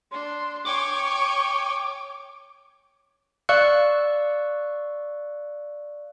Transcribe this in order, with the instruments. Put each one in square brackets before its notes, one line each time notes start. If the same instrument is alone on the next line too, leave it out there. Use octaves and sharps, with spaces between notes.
[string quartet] D4 [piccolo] C6
[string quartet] C#5 G5 G#5 [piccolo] C#6 [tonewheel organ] D6
[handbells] D5 F5 C#6 E6 F#6 C#7